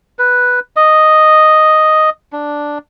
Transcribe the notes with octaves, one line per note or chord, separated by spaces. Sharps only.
B4
D#5
D4